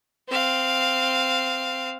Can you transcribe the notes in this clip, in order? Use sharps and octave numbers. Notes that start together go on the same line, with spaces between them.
C4 F5